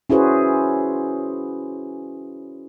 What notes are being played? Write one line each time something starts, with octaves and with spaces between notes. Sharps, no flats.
C#4 E4 F#4 G#4 B4 C5